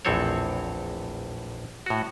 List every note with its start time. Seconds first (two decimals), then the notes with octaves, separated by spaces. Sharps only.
0.05 A#1 E2 A2 C4 A4 C#5
1.86 A2 F#4